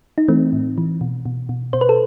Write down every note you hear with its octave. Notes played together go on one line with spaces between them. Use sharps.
D#4
E3 A3 C4
A2
E3
B2
B2
B2
B2 C5
B4
A4